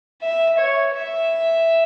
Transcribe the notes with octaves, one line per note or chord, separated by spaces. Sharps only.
E5
C#5
E5